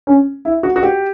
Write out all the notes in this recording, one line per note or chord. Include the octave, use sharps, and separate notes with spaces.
C#4
E4
F#4
F#4
G4